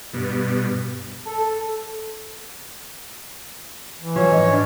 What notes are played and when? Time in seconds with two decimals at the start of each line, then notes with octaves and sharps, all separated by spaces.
0.13 G2 B2
1.25 A4
3.97 E3
4.16 F3 F#3 C#4 C#5
4.32 G#2 D#5
4.49 D4